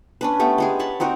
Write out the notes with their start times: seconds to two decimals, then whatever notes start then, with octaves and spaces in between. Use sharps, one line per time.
0.21 C#4 D4 B4
0.40 A3 B3 G4
0.58 G#3 G4 G#4
0.79 C#5 A5 B5
1.00 C4 D#4 F#4 A#4